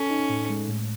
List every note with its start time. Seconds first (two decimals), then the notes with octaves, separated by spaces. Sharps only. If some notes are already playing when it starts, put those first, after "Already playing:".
Already playing: C#4 A4
0.10 D#4
0.29 A2
0.50 G#3
0.68 A2